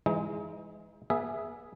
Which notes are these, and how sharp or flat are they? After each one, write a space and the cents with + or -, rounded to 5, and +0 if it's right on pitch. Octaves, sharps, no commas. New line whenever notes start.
E3 +25 G#3 -5 D#4 +35
B3 -45 G#4 +0 E5 +0